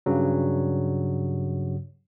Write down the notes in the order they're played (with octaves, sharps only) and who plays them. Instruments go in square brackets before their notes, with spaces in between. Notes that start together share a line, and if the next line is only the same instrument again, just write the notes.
[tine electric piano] G2 C#3 F#3